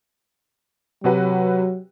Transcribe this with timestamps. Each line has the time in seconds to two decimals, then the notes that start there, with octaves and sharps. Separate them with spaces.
1.04 C3 F#3 F#4 B4